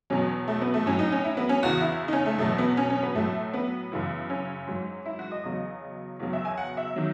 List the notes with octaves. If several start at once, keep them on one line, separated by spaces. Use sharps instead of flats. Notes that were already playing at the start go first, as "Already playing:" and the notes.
E2 B2 F#3 C#4
A3
B3
A3
A2 F#3 C#4
D#4
C#4
E4
B3
C#4
E2 C#3 E3 F#4
E4
D#4
C#4
A3
E2 B2 F#3 A3
B3
C#4
C#4
B3
A2 F#3 A3
B3
F#2 C#3 E3
C#4
G#2 F#3
E4
F#4
D#5
E2 C#3 F#3
E2 C#3 F#3
E5
G#5
F#5
E5
D#3 F#3